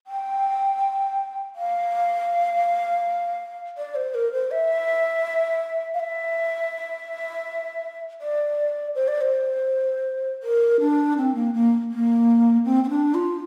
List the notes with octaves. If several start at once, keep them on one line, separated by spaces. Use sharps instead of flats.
G5
F5
D5
C5
A#4
C5
E5
F5
E5
D5
C5
D5
C5
A#4
D4
C4
A#3
A#3
A#3
C4
C4
D4
F4